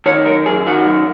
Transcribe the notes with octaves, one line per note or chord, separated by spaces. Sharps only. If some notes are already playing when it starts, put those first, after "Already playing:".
D#3 C#5
F#2 A#4
F#2 G#4
D#3 F#4
F#2